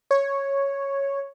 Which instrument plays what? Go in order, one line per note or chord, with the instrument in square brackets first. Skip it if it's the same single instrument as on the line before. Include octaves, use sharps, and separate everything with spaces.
[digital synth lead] C#5